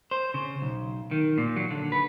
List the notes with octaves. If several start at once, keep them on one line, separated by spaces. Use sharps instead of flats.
C5
C#3
B1
D#3
A#2
F#3
D3
B4